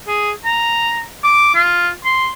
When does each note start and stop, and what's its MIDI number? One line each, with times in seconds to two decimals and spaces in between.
0.07 0.30 68
0.45 1.02 82
1.24 1.50 86
1.54 1.89 65
2.04 2.29 84